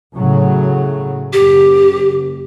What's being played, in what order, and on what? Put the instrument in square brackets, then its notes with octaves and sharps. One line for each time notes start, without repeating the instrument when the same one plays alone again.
[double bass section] A2 C#3 F#3
[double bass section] F#1 [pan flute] G4